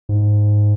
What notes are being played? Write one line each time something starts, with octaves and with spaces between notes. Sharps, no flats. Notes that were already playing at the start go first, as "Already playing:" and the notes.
G#2